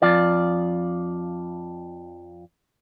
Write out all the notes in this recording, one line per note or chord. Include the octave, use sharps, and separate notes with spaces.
F2 F4 D5